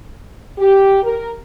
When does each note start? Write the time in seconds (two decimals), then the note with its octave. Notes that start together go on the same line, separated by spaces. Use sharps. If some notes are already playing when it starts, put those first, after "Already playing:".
0.58 G4
1.03 A#4